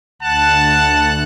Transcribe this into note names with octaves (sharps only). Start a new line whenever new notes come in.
D2 F#5 A5 F#6